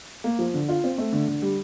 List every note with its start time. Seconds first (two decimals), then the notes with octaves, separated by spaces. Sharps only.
0.24 A#3
0.39 F3
0.54 D3
0.69 F4
0.84 C4
0.98 A3
1.13 D3
1.27 D3
1.42 G3